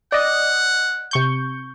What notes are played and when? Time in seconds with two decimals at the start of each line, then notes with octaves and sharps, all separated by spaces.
0.12 D5 D#5 F#5
1.11 C3 C#6 G6